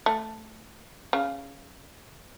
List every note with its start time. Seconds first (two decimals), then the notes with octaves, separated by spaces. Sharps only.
0.06 A3
1.13 C#3